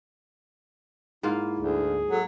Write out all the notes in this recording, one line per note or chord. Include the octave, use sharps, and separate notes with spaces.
G#2 A#3 E4 F4
D2 G#4
F#3 A4